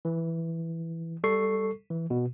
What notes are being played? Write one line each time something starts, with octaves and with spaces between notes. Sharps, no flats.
E3
G3 A4 C#6 C7
E3
B2